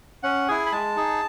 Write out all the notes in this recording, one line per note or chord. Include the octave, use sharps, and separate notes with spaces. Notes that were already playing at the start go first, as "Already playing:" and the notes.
C#4 F#5
E4 G#4 G#5
B5
G#3 A5
D#4 G#4